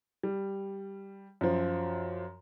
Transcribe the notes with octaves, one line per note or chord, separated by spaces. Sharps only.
G3
F#2 F3